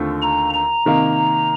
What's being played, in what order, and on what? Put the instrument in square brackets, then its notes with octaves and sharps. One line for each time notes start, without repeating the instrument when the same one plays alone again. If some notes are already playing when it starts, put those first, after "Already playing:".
Already playing: [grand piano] D#2 D3 A3 C4 F4
[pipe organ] A#5
A#5
[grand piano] C3 D#3 A#3